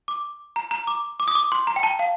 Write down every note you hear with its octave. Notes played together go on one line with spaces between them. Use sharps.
D6
A#5
A#5
D6
D6
D#6
D6
C6
A#5
G5
A5
F5